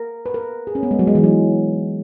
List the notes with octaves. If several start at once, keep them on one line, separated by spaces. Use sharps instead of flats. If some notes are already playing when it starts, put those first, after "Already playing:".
Already playing: A#4
B4
A#4
G#4
C#4
B3
G#3
F#3
G#3
E3
F#3